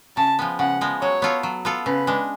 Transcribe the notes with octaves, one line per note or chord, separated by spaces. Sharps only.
C#3 A5
F3 G#3 B3
C#3 F#5
F3 G#3 B3
F#3 C#5
B3 F4 A4
F#3
B3 F4 A4
C#3 B4
G#3 D4